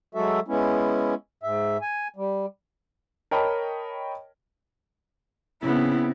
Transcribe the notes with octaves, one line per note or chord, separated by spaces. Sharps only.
F#3 G#3 F#4 A4 E5
G#3 B3 C#4 E4
G#2 E5
G#5
G3
A#4 C#5 D#5 G5 A5 B5
C#3 B3 C4 E4